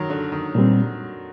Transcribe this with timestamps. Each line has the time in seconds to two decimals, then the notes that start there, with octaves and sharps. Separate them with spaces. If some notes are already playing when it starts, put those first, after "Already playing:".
Already playing: D#3 F#3
0.10 D3
0.32 D#3
0.55 A#2 G3 C4